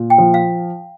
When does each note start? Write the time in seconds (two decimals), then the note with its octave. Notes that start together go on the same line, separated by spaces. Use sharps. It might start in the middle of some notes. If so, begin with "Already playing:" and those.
Already playing: A#2
0.10 G5
0.18 F3
0.34 F5